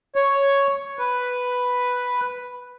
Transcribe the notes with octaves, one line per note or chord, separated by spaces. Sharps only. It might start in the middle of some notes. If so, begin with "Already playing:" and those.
C#5
B4